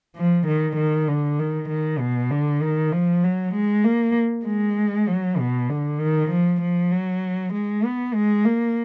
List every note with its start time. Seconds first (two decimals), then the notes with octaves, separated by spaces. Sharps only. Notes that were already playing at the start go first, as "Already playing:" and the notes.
0.16 F3
0.47 D#3
0.77 D#3
1.09 D3
1.40 D#3
1.69 D#3
2.00 B2
2.31 D3
2.62 D#3
2.92 F3
3.24 F#3
3.55 G#3
3.84 A#3
4.46 G#3
5.07 F#3
5.39 B2
5.70 D3
6.00 D#3
6.31 F3
6.62 F3
6.91 F#3
7.54 G#3
7.85 B3
8.14 G#3
8.45 A#3